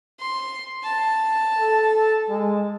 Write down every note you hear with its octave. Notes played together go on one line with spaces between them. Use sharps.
C6
A5
A4
G#3